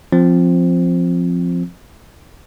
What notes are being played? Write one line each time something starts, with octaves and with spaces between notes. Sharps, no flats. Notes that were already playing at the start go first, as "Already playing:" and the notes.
F3 C4